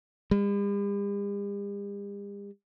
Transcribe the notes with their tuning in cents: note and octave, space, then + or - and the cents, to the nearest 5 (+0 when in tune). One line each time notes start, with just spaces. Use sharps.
G3 +45